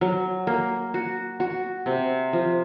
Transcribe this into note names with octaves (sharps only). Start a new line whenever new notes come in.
F#3
A#3
F#4
F#4
C3
F3